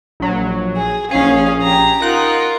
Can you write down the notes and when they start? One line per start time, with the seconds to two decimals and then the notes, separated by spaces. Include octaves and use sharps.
0.20 A#1 F#3
0.76 G#4
1.11 A#1 C#4 G#4 F5
1.62 G4 A#5
2.02 D#4 F4 A#4 F#5 F#6